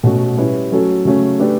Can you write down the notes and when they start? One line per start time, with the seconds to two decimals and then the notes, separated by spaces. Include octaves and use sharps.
0.03 B2 A3 C#4 F#4
0.37 G3 C#4 E4 B4
0.72 F#3 A3 C#4 F#4 A4
1.05 C#3 F#3 A3 C#4
1.40 A3 D4 G4 B4